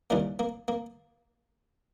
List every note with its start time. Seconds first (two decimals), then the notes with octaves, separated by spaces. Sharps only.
0.10 D#2 C#3 E3 G3 A#3
0.39 A#3
0.68 A#3